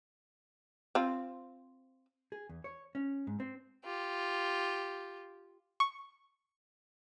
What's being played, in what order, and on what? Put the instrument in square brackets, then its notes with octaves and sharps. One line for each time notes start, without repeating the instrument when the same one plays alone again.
[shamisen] C4 F4
[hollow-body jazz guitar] G#4
E2
C#5
C#4
G#2
C4
[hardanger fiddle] F4 G4
[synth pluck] C#6